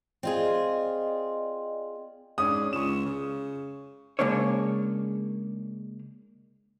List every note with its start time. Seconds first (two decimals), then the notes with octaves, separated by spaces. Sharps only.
0.23 C4 F4 G#4 D5 D#5 C6
2.38 G#2 C#4 D4 D#6
2.73 C#2 C#6 E7
3.06 C#3
4.19 C#3 G#3 A#3 D4 C#5